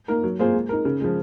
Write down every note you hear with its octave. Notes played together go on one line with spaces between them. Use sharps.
A#3 D#4 A#4
F#3
A#3 F4 G#4 C5
G#3
D#4 A#4
C#3
F3 G#3